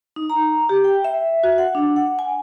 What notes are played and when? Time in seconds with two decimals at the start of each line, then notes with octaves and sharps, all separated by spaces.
0.16 D#4
0.30 A#5
0.69 G4
0.84 G5
1.04 E5
1.43 F#4
1.58 F#5
1.75 D4
1.96 F#5
2.19 G#5